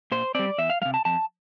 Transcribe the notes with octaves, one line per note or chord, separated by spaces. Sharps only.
A#2 C5
G3 C4 D5
E2 E5
F5
C3 G3 F5
A5
F2 A5